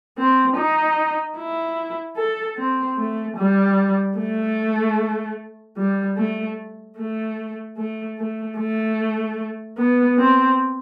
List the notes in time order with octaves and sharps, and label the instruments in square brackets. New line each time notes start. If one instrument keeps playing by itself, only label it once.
[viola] C4
D#4
E4
A4
C4
A3
G3
A3
G3
A3
A3
A3
A3
A3
B3
C4